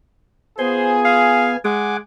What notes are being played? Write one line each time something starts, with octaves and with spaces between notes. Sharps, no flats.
B3 F4 G#4 C5 G#5
F5
G#3 F#5 G#5 D6